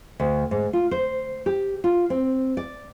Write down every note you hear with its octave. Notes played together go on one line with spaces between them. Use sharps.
D2
G#2
F4
C5
G4
F4
C4
D5